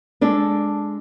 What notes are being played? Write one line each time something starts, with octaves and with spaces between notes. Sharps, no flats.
G#3 D4 A4